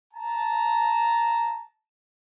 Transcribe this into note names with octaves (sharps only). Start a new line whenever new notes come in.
A5 A#5